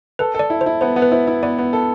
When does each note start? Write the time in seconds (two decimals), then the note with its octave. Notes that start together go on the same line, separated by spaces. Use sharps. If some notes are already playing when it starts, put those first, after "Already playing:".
0.19 A4 B4
0.35 A4 D5
0.50 E4
0.61 C5
0.66 E4
0.81 B3 C5
0.96 B3
1.02 B4
1.12 E4 C5
1.27 E4
1.43 B3 D5
1.58 B3
1.73 A4